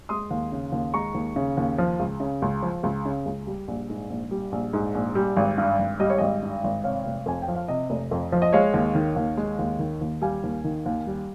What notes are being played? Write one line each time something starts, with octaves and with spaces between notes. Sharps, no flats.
G#3 C6 D#6
D#2
C#3
D#2
G#3 A#5 C#6
D#2
C#3
D#2
F3
C#2
C#3
C#2
F3
C#2
C#3
C#2
G3
A#1
G#2
A#1
G3
A#1
G#2
A#1
G3
G#1
G2
G#1
G3 D#5
C#5
G#1 D#5
G2
G#1
C3 C#5 F5
F1
F2 G#5
G5
F3
F5
C3 D#5
F1
F2
F3
D#5
G#3 C#5 F5
D#2
D#3
D#2
G#3
D#2
D#3
D#2
G3 F5 G#5
D#2
D#3
D#2
G3